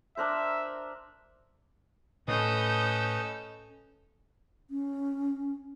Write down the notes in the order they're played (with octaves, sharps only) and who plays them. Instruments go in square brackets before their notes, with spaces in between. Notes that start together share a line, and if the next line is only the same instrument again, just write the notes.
[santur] D4 A#4 C5 [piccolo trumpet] E5
[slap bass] A2 [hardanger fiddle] C#4 A4 [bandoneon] B4 D#5 [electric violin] D#6 G6
[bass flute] C#4